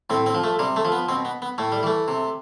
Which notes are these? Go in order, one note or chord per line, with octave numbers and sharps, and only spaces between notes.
A2 C4
C4
F3
A3
C3 G3
A3
F3
B3
B2 C4
B3
B3
A2 A3
G3
E3 A3
C3